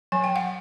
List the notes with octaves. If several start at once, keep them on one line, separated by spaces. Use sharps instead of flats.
F#3 G#5
G5
F#5